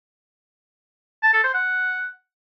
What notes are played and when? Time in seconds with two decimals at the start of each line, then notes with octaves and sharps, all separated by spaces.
1.23 A5
1.33 A4
1.44 C5
1.54 F#5